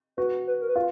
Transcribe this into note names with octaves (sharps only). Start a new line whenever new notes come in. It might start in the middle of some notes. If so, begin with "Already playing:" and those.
F#4 B4
B4
A#4
B4
F4